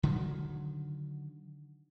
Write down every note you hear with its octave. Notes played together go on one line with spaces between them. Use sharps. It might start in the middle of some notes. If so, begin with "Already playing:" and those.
D3 D#3 F#3